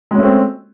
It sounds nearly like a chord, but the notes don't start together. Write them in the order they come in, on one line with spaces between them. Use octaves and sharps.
G#3 C#4 A3 C4